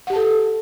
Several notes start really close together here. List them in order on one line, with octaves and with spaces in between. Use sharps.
F#5 G4 A5 A4